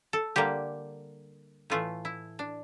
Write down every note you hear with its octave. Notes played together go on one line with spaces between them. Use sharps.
A4
D3 G3 A#3 G4
A2 E3 A3 F4
E4
D4